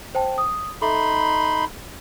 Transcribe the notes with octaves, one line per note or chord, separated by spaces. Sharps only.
C5 G5 A5
D#6
D#4 A4 E5 B5 C6